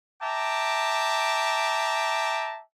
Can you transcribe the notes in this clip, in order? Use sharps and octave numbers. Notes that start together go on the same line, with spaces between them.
E5 G5 A5 A#5 D6